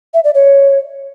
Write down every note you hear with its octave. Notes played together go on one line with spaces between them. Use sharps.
E5
D5
C#5